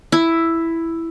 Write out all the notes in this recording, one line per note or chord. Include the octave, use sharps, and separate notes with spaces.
E4